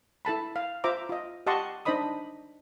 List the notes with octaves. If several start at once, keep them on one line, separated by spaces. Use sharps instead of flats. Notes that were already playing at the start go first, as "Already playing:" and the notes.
E4 A4 A5 B5
F5
F4 C5 E5 A#5 D6
F4 D#5
G4 D#5 F#5 A5 C6 C#6
D4 D#4 C5 D#5 B5 D#6